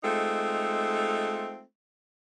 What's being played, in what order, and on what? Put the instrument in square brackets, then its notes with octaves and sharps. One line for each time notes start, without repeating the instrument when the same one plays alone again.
[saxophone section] G#3 A3 C4 D#4 F4 A4